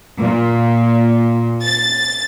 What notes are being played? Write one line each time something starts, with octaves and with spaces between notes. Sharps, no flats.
A#2
A6